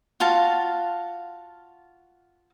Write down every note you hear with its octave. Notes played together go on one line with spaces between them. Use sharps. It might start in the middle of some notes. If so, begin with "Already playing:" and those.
F4 F#4 F5 A5